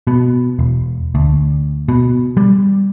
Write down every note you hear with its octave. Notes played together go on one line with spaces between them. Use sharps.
B2
E1
D2
B2
G3